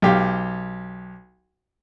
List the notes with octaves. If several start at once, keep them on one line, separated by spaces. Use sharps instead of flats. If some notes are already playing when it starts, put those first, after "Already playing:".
B1 G4 F5